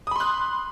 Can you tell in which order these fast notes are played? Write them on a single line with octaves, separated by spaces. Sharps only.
D#6 B5 C6 F#6